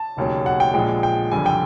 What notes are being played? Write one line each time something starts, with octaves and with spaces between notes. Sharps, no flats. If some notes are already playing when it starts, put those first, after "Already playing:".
Already playing: A5
E1 D#2 C#3 F#3
F#5
G5
A#1 A#2 F3 G#3 G5
G5
F#1 F2 D3 G3 G#5
G5